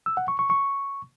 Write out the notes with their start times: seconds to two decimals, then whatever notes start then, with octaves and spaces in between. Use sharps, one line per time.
0.06 E6
0.17 F#5
0.28 C#6
0.39 C#6
0.50 C#6